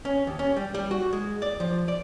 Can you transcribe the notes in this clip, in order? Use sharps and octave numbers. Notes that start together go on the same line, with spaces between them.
C#4
D#2
C#4
G3
G3
F#4
G#3
D5
F3
D5